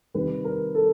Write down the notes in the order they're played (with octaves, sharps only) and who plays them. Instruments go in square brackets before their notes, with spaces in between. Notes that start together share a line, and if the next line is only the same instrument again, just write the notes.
[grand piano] C3 D#3 G3 B4
A#4
A4